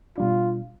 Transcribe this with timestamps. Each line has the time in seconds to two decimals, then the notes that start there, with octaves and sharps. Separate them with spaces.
0.18 B2 G3 D4 F4